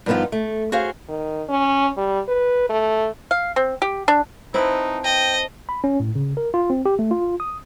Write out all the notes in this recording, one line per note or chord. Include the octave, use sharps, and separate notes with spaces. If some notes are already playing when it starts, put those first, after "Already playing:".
G2 D#3 F3 B3 D#4 F4
A3
F#4 G#4 C5 F5
D#3
C#4
G3
B4
A3
F5
C4
G4
D4
C4 D#4 E4 B4 C5 A5
D#5 G5
B5
C#4
A2
C#3
A#4
F4
C4
G4
A3
F4
D#6